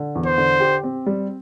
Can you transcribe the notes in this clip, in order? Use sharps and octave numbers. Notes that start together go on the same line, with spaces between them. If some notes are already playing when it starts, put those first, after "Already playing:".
Already playing: D3
E2
C5
D3
G4
C4
G3